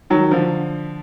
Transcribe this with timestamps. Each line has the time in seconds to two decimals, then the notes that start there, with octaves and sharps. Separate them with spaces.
0.10 D#3 F#3
0.31 D3 F3